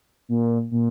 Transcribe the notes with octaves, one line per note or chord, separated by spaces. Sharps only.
A#2
A#2